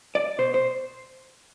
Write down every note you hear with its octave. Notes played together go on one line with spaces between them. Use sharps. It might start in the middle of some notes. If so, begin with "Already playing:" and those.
D5
B2 C5
C5